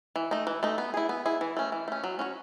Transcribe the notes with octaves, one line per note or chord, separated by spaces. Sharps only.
E3
A3 D#4
E3
A3 D#4
B3
E4 G#4
B3
E4 G#4
E3
A3 C#4
E3
A3 C#4
F#3
C#4 F#4 C#5